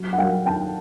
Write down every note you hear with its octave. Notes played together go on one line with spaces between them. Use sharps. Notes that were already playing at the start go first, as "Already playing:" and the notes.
Already playing: F#3
F#5
F#3 F5 G5
D#3 G5 A5